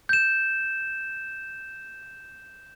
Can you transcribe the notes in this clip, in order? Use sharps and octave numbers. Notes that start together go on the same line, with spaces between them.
G6 E7